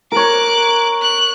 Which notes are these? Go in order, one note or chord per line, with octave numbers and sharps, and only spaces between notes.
A#4 C#5 D6 F#6
F#6